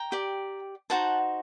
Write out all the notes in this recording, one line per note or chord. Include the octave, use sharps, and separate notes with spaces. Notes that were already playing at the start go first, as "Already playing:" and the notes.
Already playing: G5 A#5
G4 D5
D#4 F#4 C5 F#5 A5